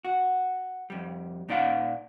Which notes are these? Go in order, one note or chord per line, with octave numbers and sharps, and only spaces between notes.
F#4
F2 G3
A#2 D#4 D5 F5 F#5